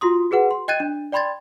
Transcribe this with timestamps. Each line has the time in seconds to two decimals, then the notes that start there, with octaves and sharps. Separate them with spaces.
0.01 F4 F#4 C6 D#6
0.31 F#4 G#4 B4 F#5
0.51 C6
0.68 D#5 G5 F#6 G#6 A6 D#7
0.80 D4
1.12 D5 G5 B5 C6 G#6 A6